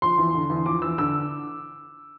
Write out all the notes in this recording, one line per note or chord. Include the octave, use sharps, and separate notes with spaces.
F3 C6
E2
D3
E2
F3 D6
E2 E6
D3 E6